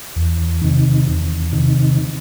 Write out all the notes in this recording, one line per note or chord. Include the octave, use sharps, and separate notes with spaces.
E2
C3 D#3
E2
C3 D#3